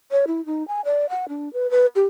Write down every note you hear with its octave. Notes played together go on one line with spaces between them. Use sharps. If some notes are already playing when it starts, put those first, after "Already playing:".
C#5
E4
D#4
G#5
D5
F#5
D4
B4
B4
G4